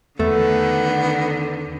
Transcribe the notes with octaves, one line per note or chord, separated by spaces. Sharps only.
E2 D3 D#3 A3 B3